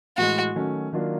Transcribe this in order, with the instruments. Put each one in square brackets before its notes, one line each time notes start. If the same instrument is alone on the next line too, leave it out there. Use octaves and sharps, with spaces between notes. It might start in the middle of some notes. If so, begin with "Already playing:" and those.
[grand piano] A2 E3 G#3 [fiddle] F#4
[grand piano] D#3 F#3 A3 C#4
D#3 F#3 A#3 D4 F4